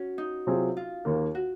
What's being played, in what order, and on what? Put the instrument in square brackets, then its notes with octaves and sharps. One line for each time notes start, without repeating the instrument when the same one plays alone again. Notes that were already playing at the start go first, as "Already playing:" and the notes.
Already playing: [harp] C#4 F#4
D#4
[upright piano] C3 F#3 C4 F4 G#4
[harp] F4
[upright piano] D#2 D#3 A#3
[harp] F#4